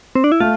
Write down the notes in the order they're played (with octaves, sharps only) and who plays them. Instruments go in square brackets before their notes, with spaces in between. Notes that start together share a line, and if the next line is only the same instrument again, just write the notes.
[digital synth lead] C4
D4
E4
[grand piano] A3 [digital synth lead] F4